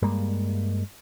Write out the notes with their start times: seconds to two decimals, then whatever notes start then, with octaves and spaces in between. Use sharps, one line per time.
0.02 G2 G3 G#3 A#3